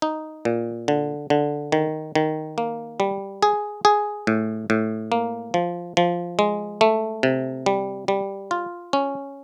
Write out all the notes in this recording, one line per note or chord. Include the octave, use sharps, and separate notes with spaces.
D#4
A#2
D3
D3
D#3
D#3
A#3
G3
G#4
G#4
A2
A2
A#3
F3
F3
G#3
A3
C3
G3
G3
F4
C#4